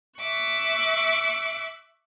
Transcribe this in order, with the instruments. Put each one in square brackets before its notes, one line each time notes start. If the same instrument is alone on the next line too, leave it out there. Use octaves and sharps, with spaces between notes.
[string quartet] E5 C#6 D6 F#6